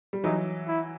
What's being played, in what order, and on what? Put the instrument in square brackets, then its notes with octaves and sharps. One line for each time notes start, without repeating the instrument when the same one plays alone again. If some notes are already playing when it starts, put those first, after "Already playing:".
[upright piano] G3
[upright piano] E3 F#3 [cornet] D#4
[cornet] E4